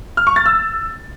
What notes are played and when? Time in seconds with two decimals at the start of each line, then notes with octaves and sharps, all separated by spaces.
0.17 F6
0.27 C#6
0.36 A6
0.46 E6